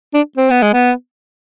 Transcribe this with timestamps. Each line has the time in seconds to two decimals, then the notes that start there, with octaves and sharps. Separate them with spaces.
0.14 D4
0.37 C4
0.50 B3
0.62 G#3
0.73 B3